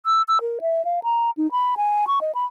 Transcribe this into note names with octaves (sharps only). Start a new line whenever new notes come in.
E6
E6
A#4
E5
F5
A#5
D#4
B5
G#5
C#6
D#5
B5